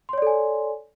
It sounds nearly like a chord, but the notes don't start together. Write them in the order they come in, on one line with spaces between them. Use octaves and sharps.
C6 C#5 D5 A4 G#5